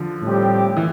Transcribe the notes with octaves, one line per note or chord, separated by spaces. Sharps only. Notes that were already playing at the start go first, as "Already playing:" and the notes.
Already playing: D3 F3
A2 G3 C4 G4
E3